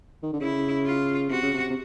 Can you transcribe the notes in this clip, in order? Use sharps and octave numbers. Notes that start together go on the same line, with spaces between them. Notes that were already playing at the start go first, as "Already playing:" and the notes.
D#3
D3
C#3 E4
F4
C3 F#4
C#3
C3
C3